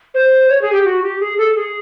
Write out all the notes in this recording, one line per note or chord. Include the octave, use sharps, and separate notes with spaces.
C5
C#5
G#4
G4
F#4
G4
G#4
A4
G#4